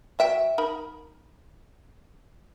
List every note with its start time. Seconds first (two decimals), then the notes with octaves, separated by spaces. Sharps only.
0.19 F#3 E5 G5
0.58 D#4 A#4 B5